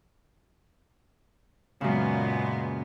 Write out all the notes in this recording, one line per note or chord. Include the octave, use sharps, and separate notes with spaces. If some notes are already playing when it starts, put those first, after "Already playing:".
F#2 A#2 C#3 G#3 B3